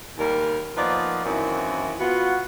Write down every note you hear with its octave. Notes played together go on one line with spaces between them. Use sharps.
D#2 G#2 D#3 G3 A#4
F3 A#3 B3 D#4 F4 D5
F#2 D#3 E3 A#3 C4 E4
B3 F4 F#4